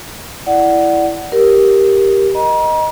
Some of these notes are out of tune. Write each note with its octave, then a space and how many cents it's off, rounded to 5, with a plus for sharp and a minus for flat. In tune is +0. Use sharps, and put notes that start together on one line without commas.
E4 +10 D5 +0 F#5 +10
G4 +0 A#4 +5
D#5 +0 A#5 +40